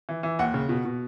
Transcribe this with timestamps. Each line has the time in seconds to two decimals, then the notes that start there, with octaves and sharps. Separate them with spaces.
0.09 E3
0.23 E3
0.39 D#2 F#5
0.54 C#3
0.69 B2
0.85 B2